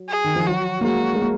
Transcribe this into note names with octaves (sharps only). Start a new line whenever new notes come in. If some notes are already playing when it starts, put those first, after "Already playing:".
Already playing: F#3
G#4
D#3
F3
F#3 F#4
A#3
G#3 F#4
G#3
A#3